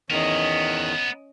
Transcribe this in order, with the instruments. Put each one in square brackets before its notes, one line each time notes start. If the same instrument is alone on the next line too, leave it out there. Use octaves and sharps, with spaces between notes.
[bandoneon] E2 D#3 [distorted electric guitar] B3 A#4 [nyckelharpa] C#4 D#5